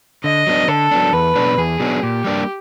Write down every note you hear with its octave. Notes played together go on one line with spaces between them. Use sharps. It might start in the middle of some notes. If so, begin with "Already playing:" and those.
D3 D#5
F#3 B3 D4
D3 A4
F#3 B3 D4
E2 B4
B2 F#3 B3 D4
E2 G#4
B2 F#3 B3 D4
A#2 G4
G3 A#3 D4